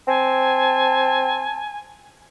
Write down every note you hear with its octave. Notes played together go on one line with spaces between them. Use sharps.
C4 G#5 A5